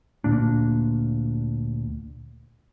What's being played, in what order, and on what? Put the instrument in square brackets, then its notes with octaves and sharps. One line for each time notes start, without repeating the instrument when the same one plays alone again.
[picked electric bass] D2 A#2 A#3 D4